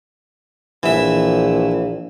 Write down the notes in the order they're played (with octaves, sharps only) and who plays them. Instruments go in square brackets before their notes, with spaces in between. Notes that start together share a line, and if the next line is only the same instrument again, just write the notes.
[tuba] A#1 [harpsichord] E3 E5